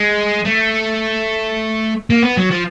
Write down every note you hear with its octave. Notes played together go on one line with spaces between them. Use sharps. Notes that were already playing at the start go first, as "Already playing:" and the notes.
Already playing: G#3
A3
A#3
B3
F#3
F3